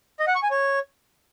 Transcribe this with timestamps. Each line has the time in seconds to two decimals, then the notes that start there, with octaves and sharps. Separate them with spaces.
0.20 D#5
0.27 F#5
0.35 C#6
0.43 G#5
0.51 C#5